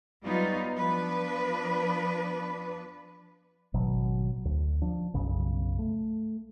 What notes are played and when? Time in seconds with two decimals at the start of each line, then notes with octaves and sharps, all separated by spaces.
0.23 F#3 G3 B3 D#4 F4
0.76 F3 B3 D4 B4
3.74 G#1 B2 F#3
4.45 D2
4.82 F3 D4
5.14 B1 F#2 C#3
5.79 A3